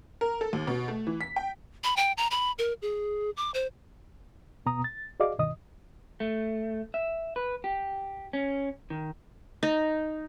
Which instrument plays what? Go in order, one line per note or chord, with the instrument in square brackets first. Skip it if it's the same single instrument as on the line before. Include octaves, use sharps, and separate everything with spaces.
[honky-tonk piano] A#4
A4
D#2
B2
A3
E3
B6
G5
[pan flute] B5
G5
A#5
B5
A#4
G#4
D6
C5
[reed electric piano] D#2 B2 B3 A#5 D#6
A6
F#4 G#4 D5 D#5 F5 D6
D2 G2 B2 D#3 D#5 D#6
[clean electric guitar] A3
E5
B4
G4
C#4
D#3
[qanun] D#4